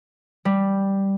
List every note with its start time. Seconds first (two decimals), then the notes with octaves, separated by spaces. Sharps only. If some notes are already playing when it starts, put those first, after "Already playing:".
0.45 G3